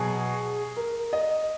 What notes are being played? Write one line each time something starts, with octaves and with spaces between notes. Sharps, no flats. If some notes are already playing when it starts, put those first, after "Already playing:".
Already playing: B2 F#3 G#4
A#4
D#5